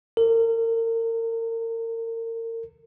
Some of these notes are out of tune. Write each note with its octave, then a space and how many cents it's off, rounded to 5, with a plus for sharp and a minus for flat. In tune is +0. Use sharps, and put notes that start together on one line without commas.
A#4 -35